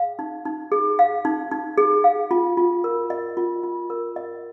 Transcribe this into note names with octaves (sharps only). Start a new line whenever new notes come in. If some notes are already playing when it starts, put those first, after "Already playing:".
Already playing: G#4 F5
D#4
D#4
G#4
F5
D#4
D#4
G#4
F5
F4
F4
A#4
D#5
F4
F4
A#4
D#5